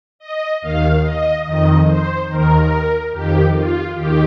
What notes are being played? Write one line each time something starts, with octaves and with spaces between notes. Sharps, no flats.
D#5
D#2 D#3 F5
D#5
F2 D#3 D#5
C5
D#2 D#3 A#4
F2 D#3 G4
F4
D#2 D#3 G4